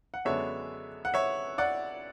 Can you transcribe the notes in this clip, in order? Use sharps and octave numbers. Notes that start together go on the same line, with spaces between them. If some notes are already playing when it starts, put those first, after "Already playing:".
F#5
F#2 D3 G#3 B3 D4 C#5 E5
F#5
C#5 E5
D5 F#5